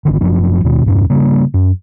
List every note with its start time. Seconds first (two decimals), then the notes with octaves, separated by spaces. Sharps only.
0.05 G1 C#2 D3 D#3
0.21 F#1 F#2 F3 D4
0.64 D#2 B2 D#3
0.86 E2 G2 C3
1.10 C#3 G3 A#3
1.54 F#2